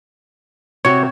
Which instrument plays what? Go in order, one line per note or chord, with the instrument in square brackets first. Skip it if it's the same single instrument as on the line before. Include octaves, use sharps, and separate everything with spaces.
[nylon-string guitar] C3 F#4 [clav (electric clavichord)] C#5